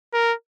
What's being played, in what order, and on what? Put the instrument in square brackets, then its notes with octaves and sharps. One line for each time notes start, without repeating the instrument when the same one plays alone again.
[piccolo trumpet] A#4